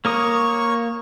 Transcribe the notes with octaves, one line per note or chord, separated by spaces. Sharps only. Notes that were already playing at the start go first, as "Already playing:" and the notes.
A#3 A#4 C#5 C#6 D#6